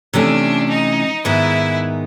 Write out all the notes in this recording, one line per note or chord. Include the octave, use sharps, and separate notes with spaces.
C3 E3 A3 C#4 D4
D#4
G#2 D#3 G#3 B3 E4